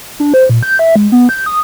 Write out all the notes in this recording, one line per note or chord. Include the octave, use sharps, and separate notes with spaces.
D4
C5
A#2
G6
E5
G#3
B3
G6
D#6